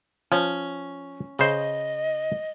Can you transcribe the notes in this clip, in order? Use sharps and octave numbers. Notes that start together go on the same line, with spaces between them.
F3 C#4
C#3 C5 D#5